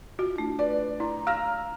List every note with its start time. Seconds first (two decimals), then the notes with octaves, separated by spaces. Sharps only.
0.19 F4 F#4
0.36 A3 D4 E4
0.59 B4 D5
1.00 E4 A#5
1.27 F5 E6 F6 A#6